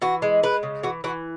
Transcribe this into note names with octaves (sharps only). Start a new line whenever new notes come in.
E3 F#4
G#3
G#3 B4
C#3
E3 F#4
E3 F#4